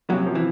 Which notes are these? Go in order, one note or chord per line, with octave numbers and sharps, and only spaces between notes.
F#2 C3 F#3
F3
E3